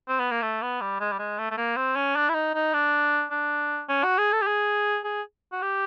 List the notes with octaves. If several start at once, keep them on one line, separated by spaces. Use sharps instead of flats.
C4
B3
A#3
A3
B3
G3
G#3
G3
G#3
A3
A3
A#3
C4
C#4
D4
E4
D#4
D#4
D4
D4
C#4
F#4
G#4
A4
G4
G#4
G#4
F#4
G4